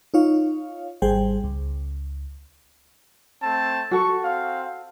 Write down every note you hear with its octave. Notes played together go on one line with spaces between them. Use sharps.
D#4 F4 C#5 F5
G#1 G3 G#4 C5 G5
C#2
A3 C4 A5
F#4 A4 C#6
C4 F5